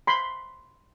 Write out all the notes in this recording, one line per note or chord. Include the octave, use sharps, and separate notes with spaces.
B5 C6